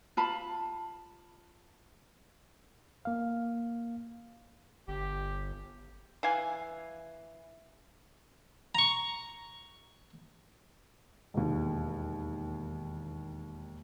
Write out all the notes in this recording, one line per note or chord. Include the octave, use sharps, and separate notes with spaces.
F4 A5 B5
A#3 F5
G1 G4
E3 F5 G#5
A#5 C#6
E1 D#2